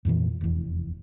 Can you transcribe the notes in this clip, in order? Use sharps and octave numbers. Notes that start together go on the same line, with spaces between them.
F2 A#2 D3 E3
F1 E2